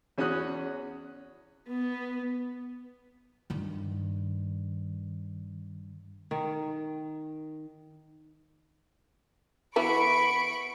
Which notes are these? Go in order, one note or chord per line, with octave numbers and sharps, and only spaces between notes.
E2 C#4 F#4 D#6 F#6
B3
G2 D#3
D#3
E3 B3 F#4 B5 C#6 D7